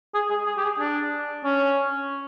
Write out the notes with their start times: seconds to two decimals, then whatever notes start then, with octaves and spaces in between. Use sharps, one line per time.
0.15 G#4
0.30 G#4
0.47 G#4
0.57 G4
0.63 G#4
0.80 D4
1.44 C#4